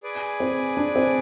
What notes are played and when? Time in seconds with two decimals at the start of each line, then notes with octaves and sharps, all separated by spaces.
0.03 G#4 B4 D5 G#5
0.40 C4
0.77 D4
0.96 C4